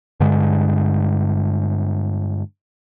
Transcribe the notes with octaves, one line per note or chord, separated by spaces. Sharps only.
G2 D3 G#3